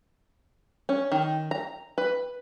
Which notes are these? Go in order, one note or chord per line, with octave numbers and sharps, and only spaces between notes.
C#4
D#3
A#5
B4